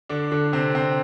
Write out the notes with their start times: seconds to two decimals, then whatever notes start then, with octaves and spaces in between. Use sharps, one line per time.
0.09 D3 D4
0.31 D3 D4
0.53 C3 C4
0.75 C3 C4